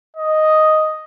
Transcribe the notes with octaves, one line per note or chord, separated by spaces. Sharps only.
D#5